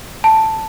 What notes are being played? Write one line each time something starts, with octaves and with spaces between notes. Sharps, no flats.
A5